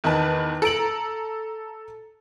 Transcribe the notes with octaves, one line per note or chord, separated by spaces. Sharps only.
E2 D#3 D#4 B4 A5
A4 A#5 D7 F#7